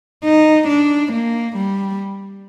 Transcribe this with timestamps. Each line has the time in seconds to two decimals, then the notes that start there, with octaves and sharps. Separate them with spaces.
0.24 D#4
0.68 D4
1.13 A#3
1.56 G3